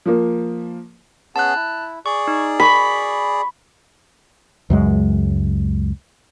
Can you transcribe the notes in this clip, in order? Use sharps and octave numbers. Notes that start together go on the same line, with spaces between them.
F3 A#3
B3 C#4 G#4 A5 F#6
E4
G#4 D5 C#6
D#4
B5 C#6 B6
C#2 F#2 G#3